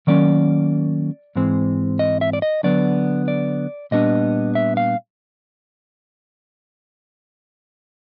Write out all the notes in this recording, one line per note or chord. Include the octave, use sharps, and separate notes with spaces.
D#3 F#3 A#3 C#4 D5
G#2 E3 G#3 C4
D#5
E5
D5
D#5
D3 F#3 B3 D5
D5
A#2 G3 B3 D4 D#5
E5
F5